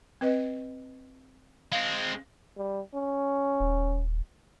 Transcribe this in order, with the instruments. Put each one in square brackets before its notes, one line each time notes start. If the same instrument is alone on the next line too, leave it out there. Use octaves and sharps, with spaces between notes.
[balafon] C4 B4 D#5
[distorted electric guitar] G#3 C4 [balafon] F5
[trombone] G3
C#4
[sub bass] D#1